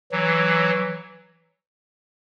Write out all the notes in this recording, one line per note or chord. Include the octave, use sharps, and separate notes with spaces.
E3 F#3